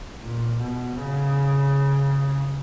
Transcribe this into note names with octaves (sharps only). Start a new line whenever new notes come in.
A#2
B2
C#3